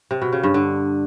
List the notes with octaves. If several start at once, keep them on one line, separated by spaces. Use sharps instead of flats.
C3
B2
C#3
G2
D3